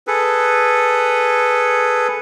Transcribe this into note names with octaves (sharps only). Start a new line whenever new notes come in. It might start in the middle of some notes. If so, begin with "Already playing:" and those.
G#4 A4 B4